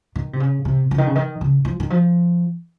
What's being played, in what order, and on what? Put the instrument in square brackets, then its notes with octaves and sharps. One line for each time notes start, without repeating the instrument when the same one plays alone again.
[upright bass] D#3
C3
C#3
C3
C#3
D#3
C#3
D#3
C#3
F3
D#3
F3